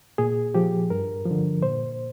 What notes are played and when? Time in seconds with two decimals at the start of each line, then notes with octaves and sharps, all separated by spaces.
0.18 A#2 G#4
0.55 F3 G4
0.90 G2 A#4
1.26 F3
1.31 D3
1.63 A#2 C5